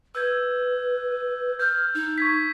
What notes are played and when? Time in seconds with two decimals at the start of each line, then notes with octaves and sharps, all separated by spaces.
0.15 B4 E6 G6 G#6
1.59 F6 G6
1.94 D#4
2.18 C#6 G#6 B6